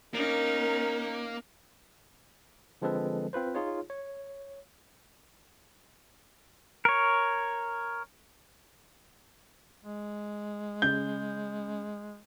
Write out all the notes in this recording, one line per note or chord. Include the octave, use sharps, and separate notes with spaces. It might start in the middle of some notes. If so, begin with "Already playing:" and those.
A#3 C#4 D#4 A#4
D3 F3 G#3 C4 A4 B4
C4 F4 B4 C5
D#4 F4 G#4 C#5
C#5
A#4 C#5
G#3
C#3 G6